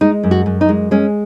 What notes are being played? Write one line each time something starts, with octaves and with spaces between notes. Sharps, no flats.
G#3 D#4
F#2
F#4
F#2
D#4
G#3
G#3 C#4